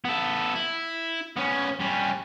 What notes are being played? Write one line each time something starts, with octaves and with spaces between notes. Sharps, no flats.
B3 A4
E4
B3 C#4
G3 C#4